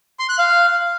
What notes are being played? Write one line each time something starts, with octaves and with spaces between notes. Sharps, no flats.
C6
F#6
F5